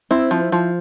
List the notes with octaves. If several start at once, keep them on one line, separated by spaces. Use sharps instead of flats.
C4 E4
F3
F3